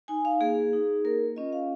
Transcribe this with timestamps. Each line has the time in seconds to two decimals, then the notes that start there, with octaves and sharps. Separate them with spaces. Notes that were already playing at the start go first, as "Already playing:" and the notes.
0.08 D#4 G#5
0.25 F5
0.41 A#3 G#4
0.73 D#4
1.04 A#3 A#4
1.36 C#4 F4 D#5
1.53 F5